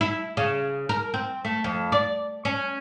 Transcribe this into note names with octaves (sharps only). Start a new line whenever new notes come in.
E4
C#3
A#4
C4
A3
F2
D5
C#4